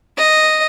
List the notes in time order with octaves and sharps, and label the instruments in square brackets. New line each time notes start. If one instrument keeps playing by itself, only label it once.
[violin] D#5